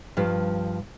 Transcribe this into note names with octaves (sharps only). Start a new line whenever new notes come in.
G2 F3